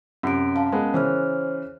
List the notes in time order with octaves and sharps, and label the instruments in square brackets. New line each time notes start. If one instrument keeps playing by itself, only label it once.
[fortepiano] F#2 C3 [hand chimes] C#4 D7
[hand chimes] C#4 F5 A5
[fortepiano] G#3 B3 [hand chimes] A#4
[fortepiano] C#3 E3 [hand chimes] C5 C#5 F6